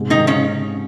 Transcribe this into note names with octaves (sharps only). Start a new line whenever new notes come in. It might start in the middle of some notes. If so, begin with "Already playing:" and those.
Already playing: G#2 C3
G#2 D#3 D#4
C#3 C#4